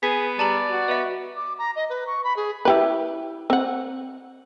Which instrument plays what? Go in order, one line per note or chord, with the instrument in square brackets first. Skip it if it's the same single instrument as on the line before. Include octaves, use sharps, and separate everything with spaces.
[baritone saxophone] B3 [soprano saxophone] G#4 [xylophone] B6
[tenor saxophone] G3 [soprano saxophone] D5 [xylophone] A5 A#5 F#7
[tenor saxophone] F#4
[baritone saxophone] B3 [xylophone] D#5 E5
[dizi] D6
A#5
D#5
B4
C#6
B5
G#4
[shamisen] E4 G4 B4
C4 F#5